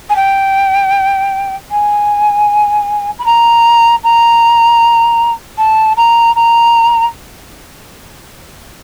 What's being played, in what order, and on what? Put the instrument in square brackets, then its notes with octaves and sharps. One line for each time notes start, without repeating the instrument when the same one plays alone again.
[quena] G#5
G5
G#5
B5
A#5
A#5
A5
A#5
A#5